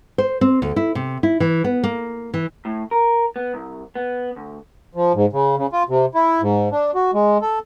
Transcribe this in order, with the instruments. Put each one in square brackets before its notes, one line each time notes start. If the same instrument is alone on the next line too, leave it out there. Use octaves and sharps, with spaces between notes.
[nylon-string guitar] C5
C4
D2
E4
C3
E4
E3
B3
A#3
E3
[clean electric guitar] A2
A#4
B3
C2
B3
D2
[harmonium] F3
G#2
C#3
C#3
F4
C3
E4
G#2
D4
F#4
G#3
A4